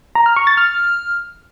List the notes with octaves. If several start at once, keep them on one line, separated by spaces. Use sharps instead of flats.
A#5
F6
C#6
A6
F6